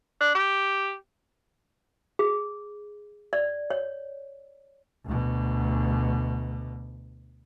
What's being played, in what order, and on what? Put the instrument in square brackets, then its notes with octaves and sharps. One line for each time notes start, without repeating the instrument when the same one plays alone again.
[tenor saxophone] D4
G4
[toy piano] G#4
D5
C#5
[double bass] D2 B2